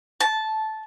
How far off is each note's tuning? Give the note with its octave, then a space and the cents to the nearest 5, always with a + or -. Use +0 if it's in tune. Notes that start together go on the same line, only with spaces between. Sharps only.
A5 -10